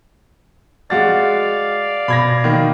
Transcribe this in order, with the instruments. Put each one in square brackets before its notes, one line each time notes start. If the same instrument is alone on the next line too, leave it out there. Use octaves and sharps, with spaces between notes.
[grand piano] G#3 F#4 A6 [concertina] D5 F5
[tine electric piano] B2 [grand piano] B5 G#6 A#6
[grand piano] D#3 A#3